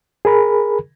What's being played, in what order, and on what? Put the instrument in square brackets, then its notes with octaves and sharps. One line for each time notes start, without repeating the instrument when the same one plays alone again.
[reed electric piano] G#4 A#4 B5